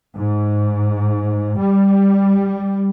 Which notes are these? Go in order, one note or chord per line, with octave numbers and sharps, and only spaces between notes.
G#2
G3